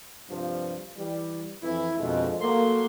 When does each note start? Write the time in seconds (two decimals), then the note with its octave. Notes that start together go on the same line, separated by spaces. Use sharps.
0.29 G2 C3 F3
0.98 E3 G3
1.63 F2 E3 E4
1.98 F2 B2 D3 F3 G#3
2.41 F#3 A3 A#3 C6